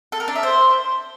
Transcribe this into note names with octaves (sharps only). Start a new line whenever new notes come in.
A4
A#4
D4
E5
C5